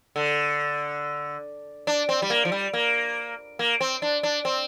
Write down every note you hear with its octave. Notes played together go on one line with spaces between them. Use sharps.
D3
D4
C4
G3
A#3
F3
G3
A#3
A#3
C4
D4
D4
C4